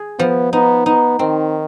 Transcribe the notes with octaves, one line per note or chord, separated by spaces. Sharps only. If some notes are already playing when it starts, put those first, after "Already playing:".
Already playing: G#4
F3 B3
B3 D#4
B3 D#4
D#3 C4